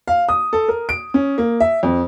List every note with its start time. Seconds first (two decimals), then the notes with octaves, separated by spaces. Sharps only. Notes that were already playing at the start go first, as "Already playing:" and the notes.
0.08 F5
0.29 D#6
0.53 A4
0.68 A#4
0.89 D7
1.14 C#4
1.38 A#3
1.60 E5
1.83 F2